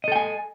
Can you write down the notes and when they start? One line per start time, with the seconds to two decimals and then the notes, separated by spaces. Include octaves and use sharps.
0.04 D#5
0.08 A4
0.12 G5
0.16 G#5